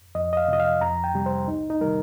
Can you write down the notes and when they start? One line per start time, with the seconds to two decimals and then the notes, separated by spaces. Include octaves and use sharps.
0.15 F2 D#5
0.33 D#5
0.37 F5
0.48 C3 F3 D#5
0.60 F5
0.81 F2 A#5
1.04 G5
1.14 C3 G3
1.26 C5
1.48 C2 D#4
1.70 D#4
1.81 C3 D#3 G3 A#4